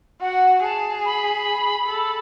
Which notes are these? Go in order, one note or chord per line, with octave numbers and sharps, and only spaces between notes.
F#4 F#5
G#4 A5
B5
A4